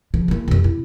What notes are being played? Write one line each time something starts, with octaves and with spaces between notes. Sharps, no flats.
C#3 F3
E2 A#3
F2 C3
E4